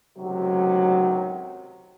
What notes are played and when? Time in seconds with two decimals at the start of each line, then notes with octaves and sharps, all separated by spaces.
0.18 C#2 A2 C3 D#3 F#3